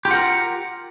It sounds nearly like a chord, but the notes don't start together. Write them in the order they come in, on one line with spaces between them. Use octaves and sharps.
G4 F4 F#5 A#4